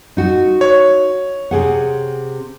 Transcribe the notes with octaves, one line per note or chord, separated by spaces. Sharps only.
D#4 F#4
C#5
C3 G#4 F#5